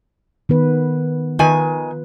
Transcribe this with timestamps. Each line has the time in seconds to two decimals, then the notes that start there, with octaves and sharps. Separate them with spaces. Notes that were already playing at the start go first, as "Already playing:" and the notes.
0.49 D#3 B3 B4
1.39 D#3 F4 B4 G#5